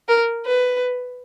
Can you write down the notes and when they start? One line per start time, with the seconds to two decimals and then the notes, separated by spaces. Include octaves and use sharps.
0.08 A#4
0.46 B4